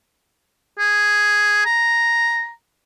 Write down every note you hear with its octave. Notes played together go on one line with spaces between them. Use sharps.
G#4
A#5